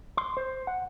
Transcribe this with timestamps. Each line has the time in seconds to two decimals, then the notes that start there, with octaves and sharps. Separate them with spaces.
0.17 C6
0.37 C5
0.67 F#5